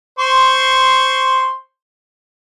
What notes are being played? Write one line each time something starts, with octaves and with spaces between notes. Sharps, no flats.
C5 C6 C#6